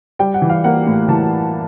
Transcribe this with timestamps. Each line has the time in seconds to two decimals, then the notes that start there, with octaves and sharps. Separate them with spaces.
0.19 G3 G5
0.34 F#5
0.42 E3
0.49 F5
0.64 A#3 F#5
0.87 A2
1.08 E3 A5